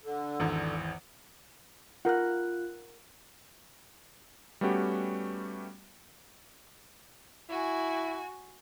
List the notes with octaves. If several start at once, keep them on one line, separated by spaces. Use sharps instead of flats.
D3
G#1 E2
F4 A#4 F#5 F#6
G3 A3 B3 C#4 F#4 G4
E4 F#4 G#5